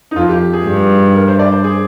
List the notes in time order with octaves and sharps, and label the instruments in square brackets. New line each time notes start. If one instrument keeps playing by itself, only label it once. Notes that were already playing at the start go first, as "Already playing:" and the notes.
[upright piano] D#4
[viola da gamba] F2 [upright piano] F4
[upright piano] G4
G#4
[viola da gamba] G2
[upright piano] A#4
C5
D5
C5
G#4